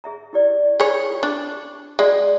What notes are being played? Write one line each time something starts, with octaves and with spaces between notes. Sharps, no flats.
G#4 E5 A#5
E4 G4 D5
G#4 C#5
F4 G4 G5
D4 C#6 D6
G#3 F#4 D5